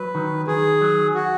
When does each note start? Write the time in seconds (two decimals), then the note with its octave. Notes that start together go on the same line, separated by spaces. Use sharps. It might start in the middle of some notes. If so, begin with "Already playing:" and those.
Already playing: F#3 B4
0.15 D#3
0.47 D#3 G#4
0.81 F#3
1.15 F#4